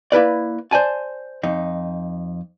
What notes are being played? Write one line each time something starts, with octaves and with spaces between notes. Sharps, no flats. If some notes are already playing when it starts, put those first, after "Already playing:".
A#3 E4 B4 D5
C5 D5 G#5 A5
F2 D#4